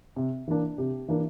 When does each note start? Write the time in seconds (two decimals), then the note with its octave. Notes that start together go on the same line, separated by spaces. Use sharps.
0.16 C3
0.48 E3 A#3 D4
0.78 C3 G4
1.08 E3 A#3 D4